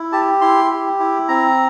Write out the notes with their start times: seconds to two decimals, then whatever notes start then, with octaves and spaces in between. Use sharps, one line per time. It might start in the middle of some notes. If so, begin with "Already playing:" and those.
Already playing: E4
0.12 G4 A5
0.41 E4 C6
0.71 G4
0.99 E4
1.28 C4 A#5